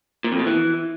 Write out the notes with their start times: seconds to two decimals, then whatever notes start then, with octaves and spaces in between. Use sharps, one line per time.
0.24 A#2
0.32 F2
0.39 B2
0.46 E3